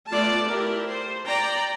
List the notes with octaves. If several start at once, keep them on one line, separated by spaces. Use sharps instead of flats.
A3 B3 F4 D5 A5
E4 G4 A#4
C5
D5 G5 A#5